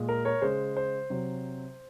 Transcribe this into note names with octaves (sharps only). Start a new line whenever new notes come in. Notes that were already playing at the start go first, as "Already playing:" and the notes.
Already playing: A#2 G#3
A#4
A#4 C#5
C#3 G#3 C5
C5
C3 F#3